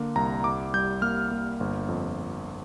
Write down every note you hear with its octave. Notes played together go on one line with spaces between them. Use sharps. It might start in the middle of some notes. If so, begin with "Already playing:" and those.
Already playing: D3 A#3
C2 A#5
C2 D6
G3 G6
A#3 F6
A#3
G1
F2